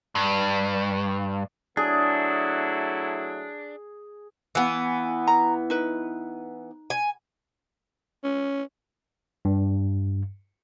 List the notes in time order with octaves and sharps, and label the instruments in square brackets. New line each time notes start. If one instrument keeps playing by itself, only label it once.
[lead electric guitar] G2
[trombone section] F#3 A3 E4 [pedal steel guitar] D4 [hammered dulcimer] G#4
[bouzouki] E3 B3 [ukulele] F5 G#5
[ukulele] A#5
D#4 B4
[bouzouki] G#5
[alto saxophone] C#4
[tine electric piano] G2